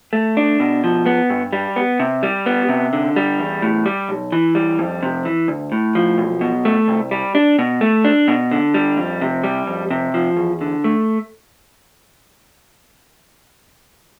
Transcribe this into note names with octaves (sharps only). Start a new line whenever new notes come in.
A3
D4
B2
F3
B3
G2
G3
B3
C3
G3
B3
C3
D3
G3
E2
A2
G3
B1
E3
G3
F2
C3
E3
D2
A2
F3
B1
B2
A3
C2
G3
D4
B2
A3
D4
B2
D3
G3
F2
C3
G3
F2
C3
F3
E2
D3
A3